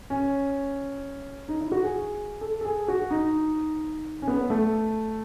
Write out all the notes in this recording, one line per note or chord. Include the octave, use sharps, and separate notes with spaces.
C#4
D#4
E4
F#4
G#4
A4
A4
G#4
F#4
D#4
C#4
B3
A3